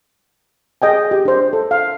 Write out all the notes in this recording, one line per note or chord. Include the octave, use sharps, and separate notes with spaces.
G#4 D#5 G5 G#5
G4
D4 C5
A4
F5